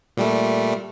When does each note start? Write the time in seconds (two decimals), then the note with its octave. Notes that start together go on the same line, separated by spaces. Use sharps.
0.17 A#2 G3 A3